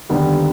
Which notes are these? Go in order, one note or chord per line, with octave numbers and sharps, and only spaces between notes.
D#2 D3 G3 B3